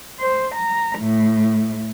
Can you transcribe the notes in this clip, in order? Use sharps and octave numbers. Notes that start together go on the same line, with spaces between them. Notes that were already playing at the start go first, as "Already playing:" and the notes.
C5
A#5
A2